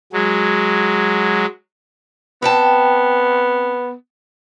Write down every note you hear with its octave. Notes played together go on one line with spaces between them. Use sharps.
F#3 G#3
B3 C4 G5 A5